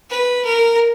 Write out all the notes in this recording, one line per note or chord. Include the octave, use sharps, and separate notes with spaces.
B4
A#4